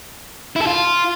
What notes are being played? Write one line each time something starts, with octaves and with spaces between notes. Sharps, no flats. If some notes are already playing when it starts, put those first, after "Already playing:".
E4
A4
F4